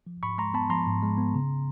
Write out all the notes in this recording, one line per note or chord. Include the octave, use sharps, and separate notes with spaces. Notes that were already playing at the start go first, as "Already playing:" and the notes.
F3
G#2 B5 C#6
G#3 A#5 C6
B3 A5 B5
F3 A#5 C6
G#2
G#3
B3
C#3